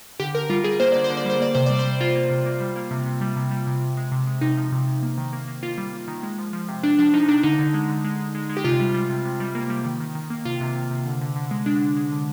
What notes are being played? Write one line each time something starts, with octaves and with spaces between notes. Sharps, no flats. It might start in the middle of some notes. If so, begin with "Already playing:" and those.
D3 G4
D3 A#4
G3 F4
G3 G#4
A#3 C5
D3 D5
C5
D3
D5
G3 C5
A#3 D5
C3 C5
G3 D5
C5
G3
A#3 F4
A#3
C3
A#3
G3
A#3
C3
C3
G3
C3
G3
C3
C3
G#3
C3
G#3
C3 D#4
F3
C3
C3
A#3
D#3
A#3
A#3
A#3 F4
G3
A#3
D#3
G#3
F3
F3
C3
C3 D4
F3 D4
F3 D#4
C3 D4
D3 D#4
D3
G#3
D3
G#3
G#3
G#3
G#3
G4
C3 F4
G3
G3
C3
C3
G3
A#3
G3
D#3
D#3
D#3
A#3
C3 F4
C3
C3
C3
D3
D3
D3
G#3
G#3 D4
D3
G#3
D3